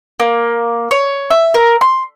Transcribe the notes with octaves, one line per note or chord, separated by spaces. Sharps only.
A#3
C#5
E5
A#4
C6